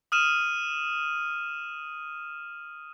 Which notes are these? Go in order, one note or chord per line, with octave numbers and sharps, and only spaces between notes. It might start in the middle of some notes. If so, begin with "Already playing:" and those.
D#6 F6 D#7 E7